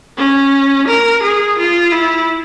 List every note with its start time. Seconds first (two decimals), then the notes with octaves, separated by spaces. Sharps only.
0.17 C#4
0.87 A#4
1.22 G#4
1.58 F4
1.92 E4